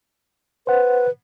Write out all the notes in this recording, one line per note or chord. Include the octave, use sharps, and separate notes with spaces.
B4 C5 F#5